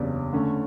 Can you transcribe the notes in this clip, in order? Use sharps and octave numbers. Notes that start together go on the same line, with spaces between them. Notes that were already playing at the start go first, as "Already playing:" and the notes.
Already playing: F#1 E2 C#3 G3 D4
D3 A3 C#4